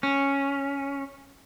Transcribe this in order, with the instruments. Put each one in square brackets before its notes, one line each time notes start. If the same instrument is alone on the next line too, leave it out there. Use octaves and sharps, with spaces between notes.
[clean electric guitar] C#4